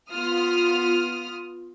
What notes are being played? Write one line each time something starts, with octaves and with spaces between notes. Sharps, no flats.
B3 F4 D#6 F6